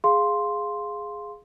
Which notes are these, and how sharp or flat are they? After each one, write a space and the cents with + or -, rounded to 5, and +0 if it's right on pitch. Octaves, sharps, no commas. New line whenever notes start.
G#4 +0 F5 +0 C6 +0